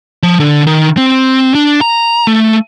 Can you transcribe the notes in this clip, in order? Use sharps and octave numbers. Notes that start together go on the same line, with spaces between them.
F3
D3
D#3
C4
D4
A#5
A3